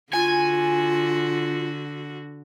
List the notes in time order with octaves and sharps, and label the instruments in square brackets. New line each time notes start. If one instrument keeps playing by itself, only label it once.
[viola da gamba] D3 F#4 [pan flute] F4 [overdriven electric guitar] G#5